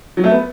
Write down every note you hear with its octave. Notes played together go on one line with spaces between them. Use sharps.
F#3
A3
B3